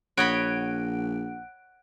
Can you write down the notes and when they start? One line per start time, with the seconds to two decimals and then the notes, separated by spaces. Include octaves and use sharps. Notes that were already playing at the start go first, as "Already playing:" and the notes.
0.17 A#1 C#5 D#5 F#5 B5 F#6 D7